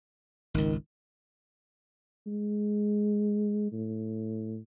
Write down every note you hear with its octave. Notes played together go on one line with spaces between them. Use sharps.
G#1 C#2 D#3
G#3
A2